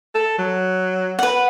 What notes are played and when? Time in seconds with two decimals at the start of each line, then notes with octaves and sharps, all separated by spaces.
0.15 A4
0.38 F#3
1.19 B4 F#5